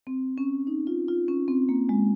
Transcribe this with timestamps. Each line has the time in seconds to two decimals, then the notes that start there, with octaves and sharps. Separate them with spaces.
0.07 C4
0.38 C#4
0.67 D#4
0.87 F4
1.08 F4
1.28 C#4
1.48 C4
1.69 A#3
1.89 G#3